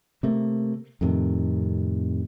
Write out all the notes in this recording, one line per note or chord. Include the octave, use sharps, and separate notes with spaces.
C3 A3 A#3
F2 A2 C3 D#3